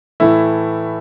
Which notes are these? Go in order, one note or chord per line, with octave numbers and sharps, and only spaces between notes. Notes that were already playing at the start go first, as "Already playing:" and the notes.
A2 E3 A3 E4